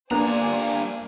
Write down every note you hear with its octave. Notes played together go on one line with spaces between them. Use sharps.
G2 A#3 B3 D4 C5 D5 G#5 A#5